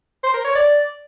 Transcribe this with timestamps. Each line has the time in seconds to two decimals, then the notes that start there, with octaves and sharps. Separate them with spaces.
0.23 C5
0.34 A#4
0.45 C#5
0.55 D5